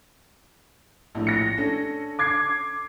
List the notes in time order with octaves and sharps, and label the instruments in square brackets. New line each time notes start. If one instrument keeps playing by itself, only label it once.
[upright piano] A#1 A2
[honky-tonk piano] A#6 C#7
[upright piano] C#4 D4 A4
[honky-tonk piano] D6 G#6 C7